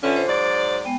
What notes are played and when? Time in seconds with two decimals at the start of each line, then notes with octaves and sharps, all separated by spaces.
0.03 D3 C#4 F4 B4 E5
0.16 C5
0.28 G#2 F#3 D5
0.85 G#3 B3 G5